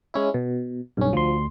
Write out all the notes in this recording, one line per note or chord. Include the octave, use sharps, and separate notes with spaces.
G#3 C#4 E4
B2
B1 G2 C#4
D2 F3 C6